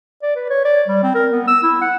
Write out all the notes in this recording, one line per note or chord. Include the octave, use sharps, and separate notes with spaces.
D5
B4
C#5
D5
G3
C4
A#4
B3
E6
E4
F#5